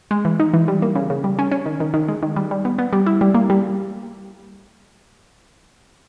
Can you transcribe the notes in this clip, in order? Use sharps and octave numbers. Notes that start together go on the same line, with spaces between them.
G#3
E3
D#4
E3
G3
A#3
C#3
C#3
G3
C#4
C#4
D#3
D#3
D#3
G#3
D#3
G3
G3
B3
B3
G3
E4
G3
A#3
G3